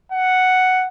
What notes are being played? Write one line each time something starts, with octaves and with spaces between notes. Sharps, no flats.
F#5